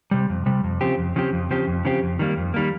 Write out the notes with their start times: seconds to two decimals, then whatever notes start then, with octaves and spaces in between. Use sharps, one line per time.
0.11 C3 G3
0.29 F2
0.46 C3 G3
0.64 F2
0.81 C#3 F3 C4 G4
0.98 F2
1.16 C#3 F3 C4 G4
1.33 F2
1.51 C#3 F3 C4 G4
1.67 F2
1.85 C#3 F3 C4 G4
2.03 F2
2.19 D#3 G3 A#3
2.37 F2
2.54 D#3 G3 A#3